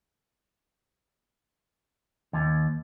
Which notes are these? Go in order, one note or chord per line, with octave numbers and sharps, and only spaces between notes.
D#2